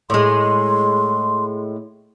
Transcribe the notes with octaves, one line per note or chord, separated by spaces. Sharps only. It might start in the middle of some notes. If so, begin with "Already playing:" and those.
A2 G#3 C6